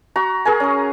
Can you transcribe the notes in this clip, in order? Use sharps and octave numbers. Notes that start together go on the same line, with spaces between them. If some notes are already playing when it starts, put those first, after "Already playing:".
F#4 A#5
G#4 A#4 G#5
C#4 A#5